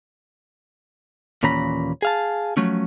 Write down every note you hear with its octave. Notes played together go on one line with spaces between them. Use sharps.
D#2 A#2 E3 C#4 A#5 B5
G#4 F5 A5
F3 F#3 A3 C#4